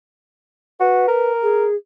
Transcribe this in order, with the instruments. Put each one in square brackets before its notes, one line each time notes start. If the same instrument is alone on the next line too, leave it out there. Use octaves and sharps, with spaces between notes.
[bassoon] F#4 [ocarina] B4
[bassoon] A#4
[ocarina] G#4